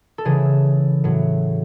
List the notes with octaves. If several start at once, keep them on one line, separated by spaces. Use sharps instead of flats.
A4
C#3 E3 G#4
A2 F#3